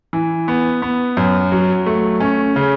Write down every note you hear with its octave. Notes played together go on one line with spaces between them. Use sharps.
E3
B3
B3
F#2
F#3
A3
C#4
C#3